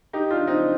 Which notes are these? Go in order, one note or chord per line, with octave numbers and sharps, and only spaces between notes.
D#4 G4
D4 F4
C4 D#4